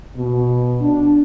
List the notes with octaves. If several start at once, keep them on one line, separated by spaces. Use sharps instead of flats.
B2
D4